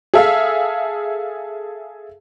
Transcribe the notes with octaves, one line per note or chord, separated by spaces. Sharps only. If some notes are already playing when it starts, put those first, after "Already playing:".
G#4 A4 E5 F5